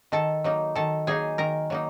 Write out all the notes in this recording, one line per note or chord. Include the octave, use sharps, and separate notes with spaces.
D#3 A4 A5
F#3 A#3 D#4
D#3 A4 A5
F#3 A#3 D#4 G#4 G#5
D#3 A#4 A#5
F#3 A#3 D#4